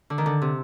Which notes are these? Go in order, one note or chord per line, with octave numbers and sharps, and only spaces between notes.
D3
D#3
D3
C3